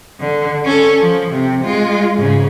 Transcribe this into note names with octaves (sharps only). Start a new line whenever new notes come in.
D3
C#4 A4
F3
C3
G#3 F4
G#2 C#3